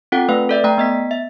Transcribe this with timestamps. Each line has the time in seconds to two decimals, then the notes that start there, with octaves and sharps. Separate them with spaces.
0.12 C4 F4 A4 F#5 G5
0.29 A3 B4 F5
0.49 A4 D5 E5
0.64 A3 G5 A#5
0.78 B3 D#5 B6
1.11 E5